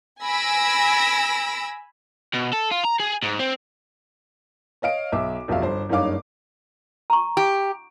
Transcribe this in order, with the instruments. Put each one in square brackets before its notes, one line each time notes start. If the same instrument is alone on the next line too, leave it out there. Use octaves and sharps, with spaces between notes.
[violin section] G#5 B5 E6 A#6 D7
[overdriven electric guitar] B2
A4
F4
A#5
G#4
G#2
C4
[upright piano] C#5 D#5 F5 D7
B1 E5 D6
F1 B1 F4 E5 F5
G1 C5
F#1 G2 D#4 C#5 F5 D6
[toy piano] A#5 C#6
[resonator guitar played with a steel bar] G4